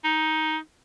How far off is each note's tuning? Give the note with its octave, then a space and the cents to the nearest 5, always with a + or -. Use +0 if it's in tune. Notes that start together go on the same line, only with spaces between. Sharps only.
D#4 +10